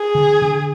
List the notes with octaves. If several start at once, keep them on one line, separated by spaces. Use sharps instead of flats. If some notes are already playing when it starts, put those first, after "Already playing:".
Already playing: G#4
D3
D3